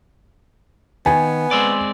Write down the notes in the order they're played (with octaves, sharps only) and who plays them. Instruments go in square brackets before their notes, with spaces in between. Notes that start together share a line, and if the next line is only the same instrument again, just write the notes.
[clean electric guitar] D#3 [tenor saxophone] B3 [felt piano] G#5
[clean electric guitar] G#3 C4 D5